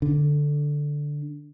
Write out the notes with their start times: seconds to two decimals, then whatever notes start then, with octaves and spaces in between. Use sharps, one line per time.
0.02 D3